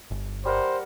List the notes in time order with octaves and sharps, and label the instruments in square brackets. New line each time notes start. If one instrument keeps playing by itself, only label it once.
[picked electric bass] G1
[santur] G3 A#4 F#5 [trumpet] C5